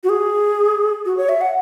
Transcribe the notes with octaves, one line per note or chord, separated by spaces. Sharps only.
F#4
G#4
F#4
C#5
E5
F#5